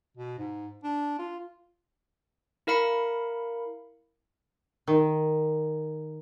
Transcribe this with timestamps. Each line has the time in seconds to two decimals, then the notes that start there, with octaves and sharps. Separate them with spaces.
0.17 B2
0.38 G#2
0.83 D4
1.19 F4
2.67 E4 A#4 F5 B5 C#7
4.87 D#3